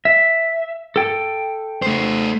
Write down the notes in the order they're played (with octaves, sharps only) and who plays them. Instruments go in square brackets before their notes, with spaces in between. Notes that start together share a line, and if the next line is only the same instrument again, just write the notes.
[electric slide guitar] E5
A4 G5
[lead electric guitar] A3 C5